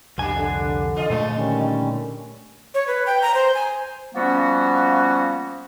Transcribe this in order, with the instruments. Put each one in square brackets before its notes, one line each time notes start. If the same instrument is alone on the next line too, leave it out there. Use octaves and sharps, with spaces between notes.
[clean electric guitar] C2 F2 G#5 [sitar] G3 D4 F#4
[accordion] D3 [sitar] D4
[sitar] E3 F4 D#5
[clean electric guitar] A#2 D3 A3 [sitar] F3 G#3
[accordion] D#3 G3 C#4
[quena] C#5
B4
G5
A#5
C5
G#5
[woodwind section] F3 G3 A#3 B3 C#4 F#4